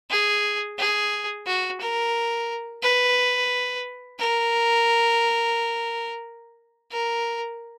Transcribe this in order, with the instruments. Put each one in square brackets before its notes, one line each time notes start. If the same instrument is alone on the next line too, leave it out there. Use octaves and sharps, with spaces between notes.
[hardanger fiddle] G#4
G#4
F#4
A#4
B4
A#4
A#4